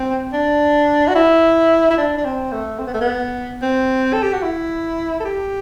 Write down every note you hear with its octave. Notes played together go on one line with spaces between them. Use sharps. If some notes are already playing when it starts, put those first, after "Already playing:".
Already playing: C4
D4
F#4
E4
E4
D4
D4
C4
A3
C4
B3
A3
B3
C4
A4
G4
F#4
E4
A4
G4